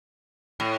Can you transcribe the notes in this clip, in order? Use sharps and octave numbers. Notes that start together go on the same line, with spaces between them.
A2